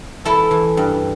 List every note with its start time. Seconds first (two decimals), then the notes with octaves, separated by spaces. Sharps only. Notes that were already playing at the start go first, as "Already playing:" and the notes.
0.24 E3 E4 A4
0.51 E3
0.77 G2